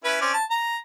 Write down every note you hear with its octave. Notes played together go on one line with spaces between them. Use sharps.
C#4 E4 B4
C4 C#4 D5
A5
A#5